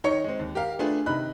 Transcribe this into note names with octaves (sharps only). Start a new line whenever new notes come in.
D#3 D#4 C#5 C#6 C#7
G#3 C4
D#2
G4 A#4 F5
A3 D4 F4 G#4 B4
C3 D#3 D#4 B5 F#6